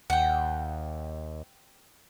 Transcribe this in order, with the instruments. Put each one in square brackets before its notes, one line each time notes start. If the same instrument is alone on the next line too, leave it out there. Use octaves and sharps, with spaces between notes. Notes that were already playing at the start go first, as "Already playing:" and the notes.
[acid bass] D#2 [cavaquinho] F#5 G5